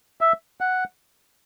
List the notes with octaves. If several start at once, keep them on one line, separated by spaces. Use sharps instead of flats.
E5
F#5